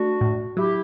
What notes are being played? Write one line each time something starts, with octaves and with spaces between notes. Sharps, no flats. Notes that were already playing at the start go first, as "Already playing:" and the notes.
Already playing: A3 D4 F#4
A2
F#3 E4 G4